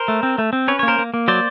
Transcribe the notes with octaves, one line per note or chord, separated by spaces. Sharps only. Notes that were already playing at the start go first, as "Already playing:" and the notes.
Already playing: A#4 C5
A3
C4
A3
C4
C#4 B4 C#5
A#3 C#5
A#4 C5
A#3
A#3
F#3 C5 D5